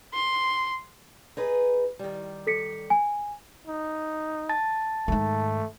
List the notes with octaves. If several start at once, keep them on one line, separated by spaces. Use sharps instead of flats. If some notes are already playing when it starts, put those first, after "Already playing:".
C6
D#4 G#4 B4
D#3 G3
A4 B6 C#7
G#5
D#4
A5 A6
G#2 D#3 A3